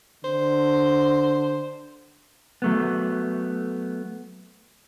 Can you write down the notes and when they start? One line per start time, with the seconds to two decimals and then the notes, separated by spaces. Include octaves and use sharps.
0.24 D3 C5
2.62 F#3 A3 B3